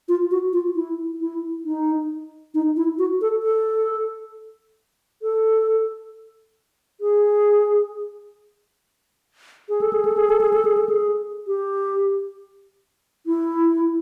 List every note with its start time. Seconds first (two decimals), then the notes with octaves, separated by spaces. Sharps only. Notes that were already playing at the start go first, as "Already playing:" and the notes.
0.09 F4
0.31 F#4
0.53 F4
0.75 E4
1.20 E4
1.65 D#4
2.54 D#4
2.76 E4
2.99 F#4
3.21 A4
3.43 A4
5.22 A4
7.01 G#4
9.69 G#4
9.81 A4
9.93 G#4
10.05 A4
10.17 G#4
10.30 A4
10.41 G#4
10.53 A4
10.65 G#4
10.78 A4
10.89 G#4
11.47 G4
13.26 E4